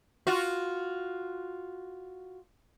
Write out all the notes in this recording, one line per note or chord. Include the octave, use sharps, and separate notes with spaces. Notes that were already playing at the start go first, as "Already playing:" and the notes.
F4 F#4